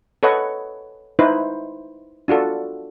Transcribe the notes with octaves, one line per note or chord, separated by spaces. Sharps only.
A4 B4 C#5 D#5 F#5
D#4 E4 B4 C5
D4 F4 F#4 A4